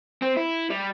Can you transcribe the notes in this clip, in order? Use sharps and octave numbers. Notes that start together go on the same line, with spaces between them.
C4
E4
G3